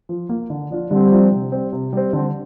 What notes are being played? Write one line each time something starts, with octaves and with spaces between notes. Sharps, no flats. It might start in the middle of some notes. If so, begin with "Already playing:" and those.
F3
A#3 F4
D3
F3 D4 F4
D3 G3 C4
F3 D4 F4
C3
G3 C4
C3
G3 C4
D3 G3 C4